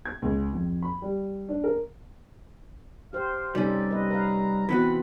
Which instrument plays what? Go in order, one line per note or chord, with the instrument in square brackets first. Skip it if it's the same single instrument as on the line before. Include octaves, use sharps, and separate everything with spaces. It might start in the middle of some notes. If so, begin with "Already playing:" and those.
[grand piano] G#6
C#2
F2
B5
G3
D4
A#4
[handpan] G4 C5 [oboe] F5
[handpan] C3 D#4 A4 [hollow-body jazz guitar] G3 C#4 [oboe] D5
[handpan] B4 D#5
[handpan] B4 F5 [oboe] A#5
[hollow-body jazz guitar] E3 B3 F#4 [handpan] C4 B4 [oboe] B5